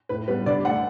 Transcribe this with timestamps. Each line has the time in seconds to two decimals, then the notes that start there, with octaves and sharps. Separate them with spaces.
0.09 A2 B4
0.28 G3 B3 B4
0.46 D3 D5
0.65 A3 D4 F#5